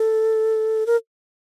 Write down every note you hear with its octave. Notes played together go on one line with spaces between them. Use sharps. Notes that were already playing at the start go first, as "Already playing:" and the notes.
Already playing: A4
A#4